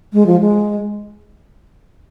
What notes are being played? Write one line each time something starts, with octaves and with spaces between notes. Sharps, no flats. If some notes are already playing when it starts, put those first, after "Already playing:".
G#3
F3
G#3